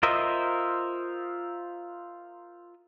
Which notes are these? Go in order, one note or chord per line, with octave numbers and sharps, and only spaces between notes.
F4 A#4 C5 D#5 E5